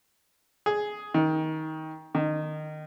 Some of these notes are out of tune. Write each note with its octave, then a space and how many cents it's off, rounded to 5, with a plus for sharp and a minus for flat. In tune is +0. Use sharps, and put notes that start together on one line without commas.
G#4 +5
D#3 +20
D#3 -20